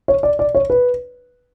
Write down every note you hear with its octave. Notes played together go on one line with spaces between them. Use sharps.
C#5
D5
D5
C#5
B4